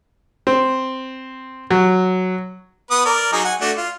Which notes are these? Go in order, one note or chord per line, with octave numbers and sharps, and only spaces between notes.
C4
F#3
B3 B4 D#6
A#4 D5
F#3 D#4 G#4
F#5 G#5
A3 D4 F#4
F4